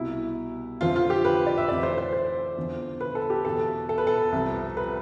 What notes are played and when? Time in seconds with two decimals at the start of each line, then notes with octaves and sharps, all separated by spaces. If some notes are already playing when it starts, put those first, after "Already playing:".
Already playing: C2 B2 E4
0.81 F1 F2 D3 F3 F4
0.96 F4
1.10 G4
1.25 B4
1.47 D5
1.58 E5
1.68 F1 F2 E3 D5
1.83 C5
1.98 C5
2.13 C5
2.57 E2 D3 F3
3.01 B4
3.15 A4
3.30 G4
3.45 E2 B2 A4
3.89 A4
3.98 B4
4.07 A4
4.32 C2 C3 F3
4.77 B4